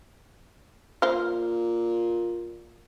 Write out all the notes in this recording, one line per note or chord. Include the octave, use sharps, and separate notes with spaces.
A#2 C5 F5